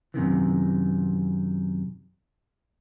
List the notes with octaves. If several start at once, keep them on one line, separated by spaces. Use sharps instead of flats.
F#2 C3 D#3 E3